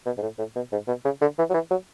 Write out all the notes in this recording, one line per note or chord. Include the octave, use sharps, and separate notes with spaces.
B2
G#2
A2
A2
B2
G#2
B2
C#3
D3
E3
F#3
E3
F#3